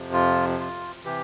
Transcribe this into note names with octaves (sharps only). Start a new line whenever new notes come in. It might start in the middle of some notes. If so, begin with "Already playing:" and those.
Already playing: F2 C3 F3
F4
F4
C3 E3 G4